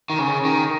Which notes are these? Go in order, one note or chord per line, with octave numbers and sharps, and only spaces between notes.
D#3
C#3
D#3